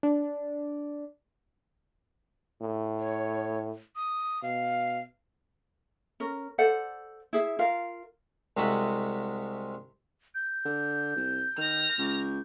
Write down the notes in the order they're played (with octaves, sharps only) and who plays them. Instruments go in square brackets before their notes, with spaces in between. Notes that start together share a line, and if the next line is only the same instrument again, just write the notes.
[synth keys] D4
[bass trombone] A2
[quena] C#5
D#6
[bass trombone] B2 [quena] F5
[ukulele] C#4 A#4
A4 C5 D5 F#5
E4 G#4 E5
F4 A#4 F5
[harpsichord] C2 C3 G#3 F#4 E5 B5
[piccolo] G6
[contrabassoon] D3
C2
[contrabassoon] D#3 [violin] F6 A#6
[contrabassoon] C#2